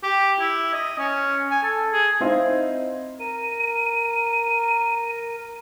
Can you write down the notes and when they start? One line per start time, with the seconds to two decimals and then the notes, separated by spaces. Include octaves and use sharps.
0.03 G4
0.40 E4
0.73 D#5
0.98 C#4
1.50 G#5
1.63 A4
1.92 G#4
2.21 C4 D#4 E4 C5 D#5 F5
3.19 A#4 D#7